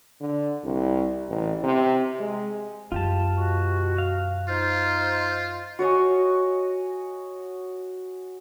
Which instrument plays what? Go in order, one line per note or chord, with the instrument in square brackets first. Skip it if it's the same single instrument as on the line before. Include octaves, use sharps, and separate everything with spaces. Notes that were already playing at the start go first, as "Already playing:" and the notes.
[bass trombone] D3
C2
A1
C3
G#3
[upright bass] F#2 [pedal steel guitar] F4 G4 A5
[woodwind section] B2 F#4
[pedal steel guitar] F5
[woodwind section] D#4 C5 [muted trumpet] F4
[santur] F#4 C#5 D#5 G#5